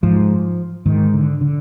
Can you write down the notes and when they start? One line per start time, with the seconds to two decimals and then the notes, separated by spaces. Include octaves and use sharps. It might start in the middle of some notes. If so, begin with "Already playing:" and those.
0.03 G#2 F3
0.86 G#2 D#3
1.14 D3
1.41 D3